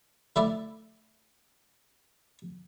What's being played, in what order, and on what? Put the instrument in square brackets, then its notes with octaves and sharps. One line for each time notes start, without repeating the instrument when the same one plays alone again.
[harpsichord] D3 A3 E4 D5 E5